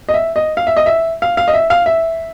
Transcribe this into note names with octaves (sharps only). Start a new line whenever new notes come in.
D#5
E5
D#5
F5
E5
D#5
E5
F5
F5
D#5
E5
F5
E5